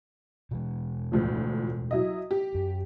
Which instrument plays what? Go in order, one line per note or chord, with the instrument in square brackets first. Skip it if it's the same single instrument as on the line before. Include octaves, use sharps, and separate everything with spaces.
[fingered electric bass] B2 E3 G#3
[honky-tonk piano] D2 A2 F3
F#3 E4 D#5
G4
[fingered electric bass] F#2